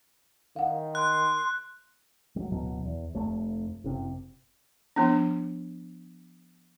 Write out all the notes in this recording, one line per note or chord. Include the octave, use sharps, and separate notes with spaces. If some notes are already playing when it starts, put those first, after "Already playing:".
D#3 F5 F#5
C6 F#6
F#3 G3
D1 B2 F#3
E2
F1 A3
F#1 C3
F3 B3 D4